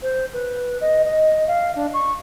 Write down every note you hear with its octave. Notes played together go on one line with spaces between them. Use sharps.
C5
B4
D#5
D#5
F5
D4
C#6